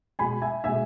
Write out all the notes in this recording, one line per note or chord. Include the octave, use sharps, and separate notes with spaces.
B2 G#3 G#5 B5
E5 G#5
B2 G#3 E5 G#5